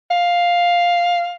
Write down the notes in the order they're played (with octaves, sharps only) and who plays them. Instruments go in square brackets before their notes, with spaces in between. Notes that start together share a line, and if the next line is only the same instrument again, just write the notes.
[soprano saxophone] F5